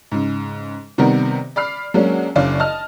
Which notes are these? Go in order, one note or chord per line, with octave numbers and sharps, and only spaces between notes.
G#2 C#3
C3 D#3 G3 B3 A#4
D5 B5 F6 C7
F#3 G#3 A#3 C#4 D4
F#1 C#3 D4 C#5 D5 F5
D#5 A5 F6